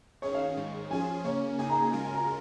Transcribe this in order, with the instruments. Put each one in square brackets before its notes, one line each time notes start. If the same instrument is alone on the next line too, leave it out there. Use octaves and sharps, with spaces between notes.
[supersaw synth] D#3 C#4 G#4 [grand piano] C#5
[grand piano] F5
[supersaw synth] G#2 D#3 G#3
[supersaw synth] F3 C#4 F4 G#4 [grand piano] G#5
[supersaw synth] C#3 A#3 C#4 [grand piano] C#5
[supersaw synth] C#3 A#3 D#4 G#4 [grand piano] G#5
[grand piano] A#5
G#5
[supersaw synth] C#3 G#3 F4 A#4
[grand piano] G#5
A#5